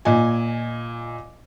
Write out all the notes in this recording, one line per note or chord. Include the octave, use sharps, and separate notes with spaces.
A#2 D#5 G#5